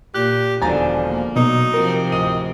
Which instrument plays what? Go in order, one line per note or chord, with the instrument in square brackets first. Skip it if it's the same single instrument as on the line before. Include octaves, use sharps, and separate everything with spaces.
[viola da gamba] A#2 [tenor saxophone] G4 [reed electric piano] F#6
[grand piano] E1 A#5 A6 [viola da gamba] D3 D#3 D4 [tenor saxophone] F3 [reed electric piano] G#5
[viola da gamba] A#3
[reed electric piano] B2 [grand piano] F#3 [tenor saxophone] D#4
[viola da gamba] C3 F3 C4 [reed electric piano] A#4
[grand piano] D1 D#7 [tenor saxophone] D#5